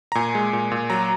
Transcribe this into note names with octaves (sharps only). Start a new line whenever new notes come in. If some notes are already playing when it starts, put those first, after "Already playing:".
A#5
A#2 G#5
G#3
A#2
A#2
F#3 A#5